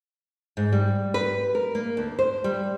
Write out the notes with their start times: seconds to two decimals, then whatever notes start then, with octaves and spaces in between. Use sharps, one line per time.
0.57 G#2
0.73 G3
1.14 B4
1.55 A#4
1.75 A#3
1.97 D2
2.19 C5
2.44 G3